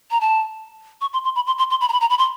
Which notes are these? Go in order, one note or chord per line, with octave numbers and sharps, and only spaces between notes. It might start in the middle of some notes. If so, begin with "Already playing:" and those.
A#5
A5
C#6
C6
C6
B5
C6
C6
C6
B5
A#5
B5
A#5
B5
C6